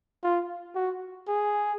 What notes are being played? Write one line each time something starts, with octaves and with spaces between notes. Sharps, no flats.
F4
F#4
G#4